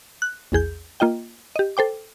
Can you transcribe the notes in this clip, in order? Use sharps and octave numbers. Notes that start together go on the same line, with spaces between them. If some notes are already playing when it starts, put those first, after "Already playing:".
F#6
A#1 E2 G#4 G6
A#3 F4 D#5 G5
G4 D#5
A4 C5 G5 D6